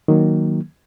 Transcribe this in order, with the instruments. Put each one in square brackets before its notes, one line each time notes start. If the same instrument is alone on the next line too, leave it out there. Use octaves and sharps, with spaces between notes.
[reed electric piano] D#3 F#3 A#3